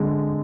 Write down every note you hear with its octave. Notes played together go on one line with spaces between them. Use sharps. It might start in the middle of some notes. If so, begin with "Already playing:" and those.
Already playing: D3 G#3